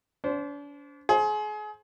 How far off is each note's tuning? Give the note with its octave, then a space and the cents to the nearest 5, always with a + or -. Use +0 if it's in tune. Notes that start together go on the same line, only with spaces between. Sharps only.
D4 -40 C5 -10
G#4 +30 C5 +30